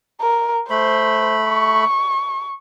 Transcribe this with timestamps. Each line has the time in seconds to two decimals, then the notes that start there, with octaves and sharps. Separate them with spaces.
0.21 A#4
0.70 A3 C5 B5
1.48 C#6